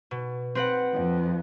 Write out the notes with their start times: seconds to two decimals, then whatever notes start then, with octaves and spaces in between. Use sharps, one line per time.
0.11 B2
0.55 C4 B4 F#5
0.93 F2